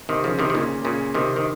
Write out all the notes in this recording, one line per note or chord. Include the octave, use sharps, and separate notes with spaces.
C3 D#3
C#3 F3
C3 D#3
D#3
A#2 C#3
A#2 C#3
C3 D#3
D#3